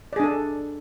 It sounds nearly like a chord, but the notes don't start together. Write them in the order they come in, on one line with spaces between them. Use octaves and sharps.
D5 G#4 D4 A4